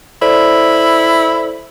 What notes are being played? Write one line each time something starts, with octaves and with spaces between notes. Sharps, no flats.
E4 A4 C5 D5